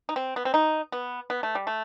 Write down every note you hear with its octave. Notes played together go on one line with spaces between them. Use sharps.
D#4
C4
B3
C4
D#4
B3
B3
A3
G3
A3